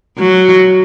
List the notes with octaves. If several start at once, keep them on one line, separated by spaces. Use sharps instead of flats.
F#3